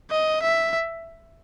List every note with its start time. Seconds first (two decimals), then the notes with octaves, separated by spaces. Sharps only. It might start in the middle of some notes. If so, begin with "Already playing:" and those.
0.11 D#5
0.43 E5